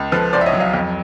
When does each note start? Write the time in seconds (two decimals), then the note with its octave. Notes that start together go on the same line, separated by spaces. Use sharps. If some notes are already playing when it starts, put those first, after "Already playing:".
Already playing: C#2
0.12 F3 A4 B4
0.33 C2 C5 D5
0.41 E5
0.46 C#5 D#5
0.53 F#3
0.60 D#5 F5
0.74 F2